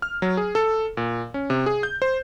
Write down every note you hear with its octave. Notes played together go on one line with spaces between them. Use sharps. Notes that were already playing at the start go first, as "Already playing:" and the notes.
F6
F#3
G#4
A4
A#2
C#4
C3
G#4
G6
C5